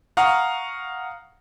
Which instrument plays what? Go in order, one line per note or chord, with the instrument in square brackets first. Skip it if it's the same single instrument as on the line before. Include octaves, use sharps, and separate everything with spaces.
[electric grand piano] F5 F#5 A#5 C#6 D#6 F6